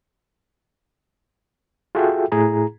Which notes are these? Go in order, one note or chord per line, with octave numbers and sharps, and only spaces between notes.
F4 F#4 G#4 A4 E5 G5
A2 E4 G#4 A#5